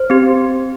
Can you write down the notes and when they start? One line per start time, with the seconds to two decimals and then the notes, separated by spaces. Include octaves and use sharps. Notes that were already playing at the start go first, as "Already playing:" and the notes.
Already playing: C5
0.10 C4 G4